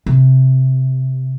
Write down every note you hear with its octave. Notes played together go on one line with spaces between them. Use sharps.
C3